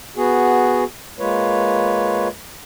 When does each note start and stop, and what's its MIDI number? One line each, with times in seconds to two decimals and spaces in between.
0.17 0.84 59
0.17 0.84 66
0.17 0.84 68
1.19 2.28 56
1.19 2.28 58
1.19 2.28 65
1.19 2.28 71
1.19 2.28 73